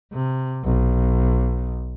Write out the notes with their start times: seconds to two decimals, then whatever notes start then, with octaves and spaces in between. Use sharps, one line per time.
0.13 C3
0.64 B1